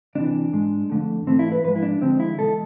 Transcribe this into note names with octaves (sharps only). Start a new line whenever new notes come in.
D2 C3 E3 D4
G#2 G#3
F2 D3 A3
G#2 E3 A3 C4
E4
B4
G#2 F3 G#3 B4
E4
D4
D2 D3 F3 G#3 C4
E4
E2 B2 G#3 A4